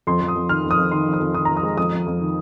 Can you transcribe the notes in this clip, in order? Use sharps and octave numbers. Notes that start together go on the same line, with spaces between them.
F2 C6
F2
D#6
F2
D#3 F6
F2
D#6
F2
D#3 C6
F2
D#6
F2
D#3 D#6
A#5
F2
D#6
G#3
F2 D#6
F2
F2
D#3